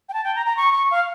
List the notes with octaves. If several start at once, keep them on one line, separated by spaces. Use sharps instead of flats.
G5
A5
G5
A#5
A#5
C#6
C#6
F5